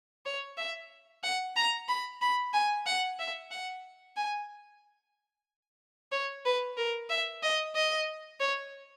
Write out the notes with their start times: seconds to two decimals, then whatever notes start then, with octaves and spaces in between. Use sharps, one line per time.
0.26 C#5
0.58 E5
1.23 F#5
1.57 A#5
1.88 B5
2.21 B5
2.53 G#5
2.86 F#5
3.19 E5
3.51 F#5
4.17 G#5
6.12 C#5
6.45 B4
6.77 A#4
7.10 E5
7.43 D#5
7.75 D#5
8.40 C#5